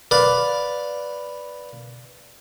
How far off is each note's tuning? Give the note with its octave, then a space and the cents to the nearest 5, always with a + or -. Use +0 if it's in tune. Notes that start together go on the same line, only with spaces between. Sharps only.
B4 +0 D5 -5 F5 +10